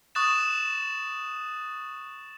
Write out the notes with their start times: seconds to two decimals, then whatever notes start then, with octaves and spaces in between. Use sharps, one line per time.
0.15 C#6 D#6 F#6 A6 E7